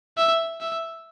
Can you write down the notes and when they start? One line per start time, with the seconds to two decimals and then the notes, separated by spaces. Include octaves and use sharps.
0.17 E5
0.61 E5